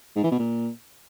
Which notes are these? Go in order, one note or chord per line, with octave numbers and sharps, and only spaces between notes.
G#2
E3
B2
A#2